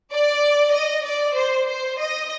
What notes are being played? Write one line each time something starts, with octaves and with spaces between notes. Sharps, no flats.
D5
D#5
D5
C5
C5
D#5